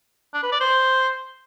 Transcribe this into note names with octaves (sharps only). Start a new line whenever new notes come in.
D4
B4
D5
C5